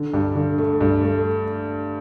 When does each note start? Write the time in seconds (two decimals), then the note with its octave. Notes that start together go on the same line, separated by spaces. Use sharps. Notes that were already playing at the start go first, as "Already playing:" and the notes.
Already playing: D3
0.14 G2
0.36 D3
0.58 A3
0.81 G2
1.03 A3